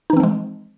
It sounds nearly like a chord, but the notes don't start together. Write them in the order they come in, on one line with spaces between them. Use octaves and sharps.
D#4 E3 C4 F3 G#3